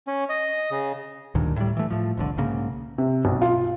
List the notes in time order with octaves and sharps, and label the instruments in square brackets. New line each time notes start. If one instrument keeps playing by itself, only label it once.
[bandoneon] C#4
D#5
C#3
[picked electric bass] D2 G2 A#2 D#3
A2 G3
E3 A3
A2 F3
F1 C2 G#2 D3
B1 G#2 C#3 A#3
[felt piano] C3
B1
F4